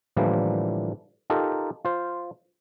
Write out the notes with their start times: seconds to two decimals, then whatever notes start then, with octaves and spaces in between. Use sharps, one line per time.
0.16 A2 D3 E3 F3 G3 A#3
1.30 D#4 F4 G4 A4 A#4
1.85 F4 C5